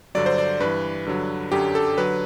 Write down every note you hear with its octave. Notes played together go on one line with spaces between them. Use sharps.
G2 D3 F#3 D5
C5
D5
G2 E3 B4
G2 D3 F#3
F#2 D3 F#3 G4
A4
D3 F#3 B4